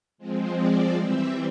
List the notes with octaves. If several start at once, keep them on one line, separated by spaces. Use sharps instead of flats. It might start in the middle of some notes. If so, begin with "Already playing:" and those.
F3 G#3 C4
D5
E3 G3 C4 E5